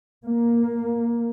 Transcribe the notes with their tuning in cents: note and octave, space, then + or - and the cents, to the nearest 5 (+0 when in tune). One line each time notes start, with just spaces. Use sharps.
A#3 +10